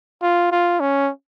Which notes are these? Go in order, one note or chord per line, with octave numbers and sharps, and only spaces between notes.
F4
F4
C#4